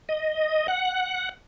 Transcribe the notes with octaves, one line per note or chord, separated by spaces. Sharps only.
D#5
F#5